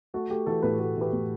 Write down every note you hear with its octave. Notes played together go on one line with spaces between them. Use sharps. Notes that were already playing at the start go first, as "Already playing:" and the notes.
A3 F#4 A4
A3 G4
E3 F#4 A4
A2 G4 B4
A3 F#4 A4
E3 G4 B4
A2